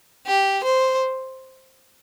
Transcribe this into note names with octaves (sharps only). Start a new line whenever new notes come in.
G4
C5